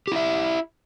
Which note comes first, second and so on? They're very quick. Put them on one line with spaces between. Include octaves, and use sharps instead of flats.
G4 E4 E5